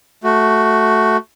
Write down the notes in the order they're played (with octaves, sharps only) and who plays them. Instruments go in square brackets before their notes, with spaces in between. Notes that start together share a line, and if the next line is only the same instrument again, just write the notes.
[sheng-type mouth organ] A3 F#4